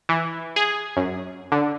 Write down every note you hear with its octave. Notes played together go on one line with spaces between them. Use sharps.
E3
G#4
F#2
D3